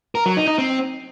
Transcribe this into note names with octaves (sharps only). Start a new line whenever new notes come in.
A#4
F#3
D#4
D#4
C4